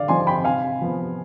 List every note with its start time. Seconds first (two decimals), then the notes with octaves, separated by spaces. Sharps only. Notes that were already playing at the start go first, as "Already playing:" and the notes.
Already playing: D3 D5 F5
0.08 F3 C4 D#4 G#5 C6
0.27 G5 B5
0.45 C3 F5 G#5
0.81 F3 B3